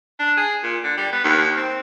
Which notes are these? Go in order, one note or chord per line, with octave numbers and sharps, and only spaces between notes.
D4
G#4
A#2
D3
G3
B3
D#2
C4